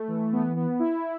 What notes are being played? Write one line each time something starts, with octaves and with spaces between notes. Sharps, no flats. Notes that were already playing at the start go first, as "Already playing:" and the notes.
Already playing: A3
E3
B3
B3
E4